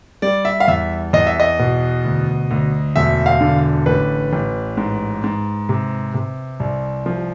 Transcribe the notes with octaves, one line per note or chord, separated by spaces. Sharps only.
G3 D5
E5
F5
E2 E5
E2 D#5
E5
D#5
B2
D2
D2
E1 E5
F5
D3
A1 B4
A1
G#2
G#2
C3
C3
C2
F3